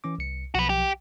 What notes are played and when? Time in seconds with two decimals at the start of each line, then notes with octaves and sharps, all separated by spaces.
0.04 E3 C#4 D6
0.18 C2 C#7
0.55 B1 F3 F#4 B4
0.69 G4